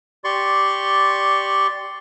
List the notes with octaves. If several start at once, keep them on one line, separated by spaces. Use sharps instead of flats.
G4 D5 C6 C#6